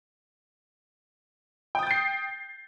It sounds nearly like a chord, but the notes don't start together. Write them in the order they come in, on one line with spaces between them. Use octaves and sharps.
G5 D#6 A6 G6 C7